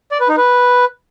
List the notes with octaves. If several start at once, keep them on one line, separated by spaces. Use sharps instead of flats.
D5
B4
D#4
B4